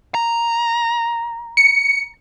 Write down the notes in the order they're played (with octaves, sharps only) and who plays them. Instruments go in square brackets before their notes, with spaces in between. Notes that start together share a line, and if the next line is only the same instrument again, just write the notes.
[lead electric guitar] A#5
[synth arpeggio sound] C#7